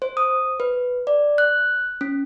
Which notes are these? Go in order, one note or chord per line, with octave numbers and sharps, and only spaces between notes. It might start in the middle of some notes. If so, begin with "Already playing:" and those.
C5
D#6
B4
D5
F#6
C#4